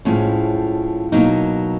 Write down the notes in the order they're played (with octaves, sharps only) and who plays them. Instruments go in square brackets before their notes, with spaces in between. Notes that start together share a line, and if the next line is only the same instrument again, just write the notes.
[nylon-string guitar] A2 F3 G#3 C#4
B2 F#3 A#3 D#4